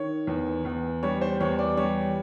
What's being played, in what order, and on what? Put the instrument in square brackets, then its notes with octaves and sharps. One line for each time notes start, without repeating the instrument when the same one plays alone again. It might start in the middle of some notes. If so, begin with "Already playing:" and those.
Already playing: [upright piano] D#3 C#5
E2
E2
G3 C#5
C5
E2 C#5
D5
G3 C#5